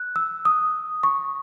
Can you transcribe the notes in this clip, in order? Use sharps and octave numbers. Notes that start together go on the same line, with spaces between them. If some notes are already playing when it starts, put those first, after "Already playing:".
Already playing: F#6
E6
D#6
C#6